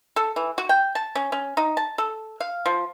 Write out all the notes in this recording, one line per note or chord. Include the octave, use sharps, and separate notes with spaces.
A4
E3
F#4
G5
A5
C#4
C#4
D#4
A5
A4
F5
F3